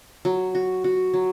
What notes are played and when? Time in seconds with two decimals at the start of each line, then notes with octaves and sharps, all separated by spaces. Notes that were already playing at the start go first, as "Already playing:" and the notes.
0.25 F#3
0.55 F#4
0.84 F#4
1.14 F#3